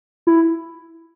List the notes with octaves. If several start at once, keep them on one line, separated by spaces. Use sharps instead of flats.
E4